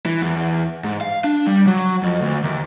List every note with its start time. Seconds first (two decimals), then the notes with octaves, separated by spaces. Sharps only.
0.06 E3
0.22 E2
0.84 G#2
1.01 F5
1.24 D4
1.47 G3
1.67 F#3
2.03 F2
2.21 D2
2.44 D#2